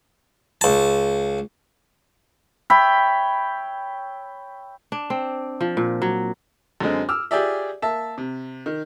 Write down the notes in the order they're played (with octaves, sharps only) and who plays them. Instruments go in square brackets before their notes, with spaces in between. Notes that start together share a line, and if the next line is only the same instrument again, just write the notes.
[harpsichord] C#2 A5
[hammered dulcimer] C#5 E5 G5 B5
[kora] D4
C4
F3
A#2
F#3
[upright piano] F#2 D3 G#3 C4
D6 E6 F6
F4 G4 G#4 D5 E5
A#3 E5 A5
C3
D#3